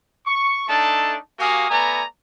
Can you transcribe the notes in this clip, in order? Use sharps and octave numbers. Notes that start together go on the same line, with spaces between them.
C#6
A3 D4 D#4 A4 A5
A#3 F#4 G4 F5 G#5 D#6
A3 B3 D5 G#5 A#5